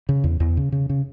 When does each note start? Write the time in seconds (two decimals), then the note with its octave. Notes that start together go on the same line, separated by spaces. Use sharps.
0.09 C#3
0.24 E2
0.40 E2
0.57 C#3
0.72 C#3
0.89 C#3